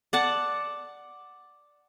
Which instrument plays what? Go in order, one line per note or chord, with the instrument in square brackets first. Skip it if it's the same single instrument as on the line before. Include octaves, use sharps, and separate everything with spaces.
[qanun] D5 F#5 A5